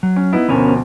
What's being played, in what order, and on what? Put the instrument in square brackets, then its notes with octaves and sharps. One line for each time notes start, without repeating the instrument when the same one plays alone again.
[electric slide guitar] F#3
[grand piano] C#4
B3 D#4 E4
[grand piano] D2 B2 F3 [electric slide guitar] B3 C#4 A#4